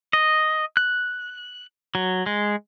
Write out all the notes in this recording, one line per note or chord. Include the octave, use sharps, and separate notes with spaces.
D#5
F#6
F#3
G#3